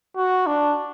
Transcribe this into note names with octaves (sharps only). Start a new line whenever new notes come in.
F#4
D4